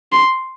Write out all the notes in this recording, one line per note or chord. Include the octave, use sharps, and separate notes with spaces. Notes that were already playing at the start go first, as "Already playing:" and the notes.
C6